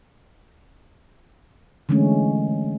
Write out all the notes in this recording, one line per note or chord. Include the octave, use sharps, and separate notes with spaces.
D3 E3 G#3 A3 C#4